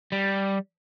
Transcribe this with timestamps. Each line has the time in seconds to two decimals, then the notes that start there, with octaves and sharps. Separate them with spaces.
0.12 G3